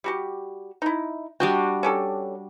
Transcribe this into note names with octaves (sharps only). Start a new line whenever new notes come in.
G3 F#4 G4
D#4 E4
G3 D4 F#4 D#5 G5
C#4 G4 A4